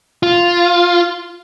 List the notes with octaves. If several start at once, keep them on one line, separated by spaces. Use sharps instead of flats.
F4